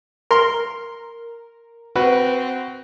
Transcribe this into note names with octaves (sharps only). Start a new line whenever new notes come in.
A#4 C6
C4 F#4 B4